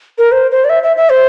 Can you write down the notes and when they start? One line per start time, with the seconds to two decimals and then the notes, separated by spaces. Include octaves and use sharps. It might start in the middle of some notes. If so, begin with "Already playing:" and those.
0.18 A#4
0.32 C5
0.51 C5
0.64 D5
0.69 E5
0.83 E5
0.97 E5
1.10 C5